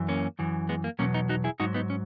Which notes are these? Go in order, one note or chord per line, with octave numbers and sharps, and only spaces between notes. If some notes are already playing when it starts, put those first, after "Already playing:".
Already playing: F#2 E3
A#3 C#4
F#2 E3
G#3 B3
A#3
E2 B2 F#3 A#3 C#4
B3 D#4
D#4 F#4
E4 G#4
G#2 F#3 D#4 F#4
B3 D#4
C#4